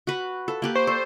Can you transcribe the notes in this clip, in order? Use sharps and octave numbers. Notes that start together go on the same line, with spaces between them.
F#4 B4
F4 A4 F5
A#3 G4 B4
C5 C#6
G4 A4 D5 C#6